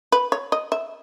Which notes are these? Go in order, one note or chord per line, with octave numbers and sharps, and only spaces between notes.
B4
C#5
D#5
E5